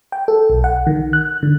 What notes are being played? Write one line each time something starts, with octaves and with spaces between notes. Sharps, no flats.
G5
A4
B1
F#5
D#3
F#6
D3